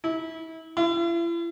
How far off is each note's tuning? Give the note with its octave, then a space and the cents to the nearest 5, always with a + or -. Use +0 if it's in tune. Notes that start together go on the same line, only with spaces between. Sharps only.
E4 -30
E4 +45